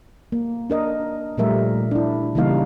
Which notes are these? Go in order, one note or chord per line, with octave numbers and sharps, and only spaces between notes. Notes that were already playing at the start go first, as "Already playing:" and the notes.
A#3
D4 A#4 D#5
A#2 F3 G3 A3 A#4 E5
D4 E4
C#3 E3 G3 A#3 D#4 F5